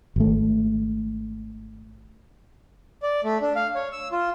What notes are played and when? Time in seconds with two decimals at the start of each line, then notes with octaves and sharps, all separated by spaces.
0.16 G#1 A3
3.03 D5
3.24 A3
3.41 D4
3.56 F5
3.75 C#5
3.92 E6
4.12 F4